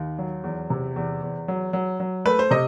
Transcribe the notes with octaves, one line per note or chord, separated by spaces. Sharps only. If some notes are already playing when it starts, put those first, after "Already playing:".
Already playing: D#2 D#3
F#3
E2
C3
E2
E2
F#3
F#3
F#3
A3 B4
C5
C3 D#5